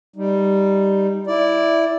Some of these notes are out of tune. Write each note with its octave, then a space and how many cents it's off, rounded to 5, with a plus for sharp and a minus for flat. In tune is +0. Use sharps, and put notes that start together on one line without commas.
G3 +0 D#4 +0
E4 +0 D5 +0